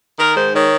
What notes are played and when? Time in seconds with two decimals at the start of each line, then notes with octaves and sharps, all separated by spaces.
0.18 D#3 A#4
0.36 G#2 C5
0.53 D#3 C#5